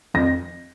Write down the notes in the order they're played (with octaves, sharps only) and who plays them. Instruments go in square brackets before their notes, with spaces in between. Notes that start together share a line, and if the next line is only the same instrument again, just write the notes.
[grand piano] F2 A#6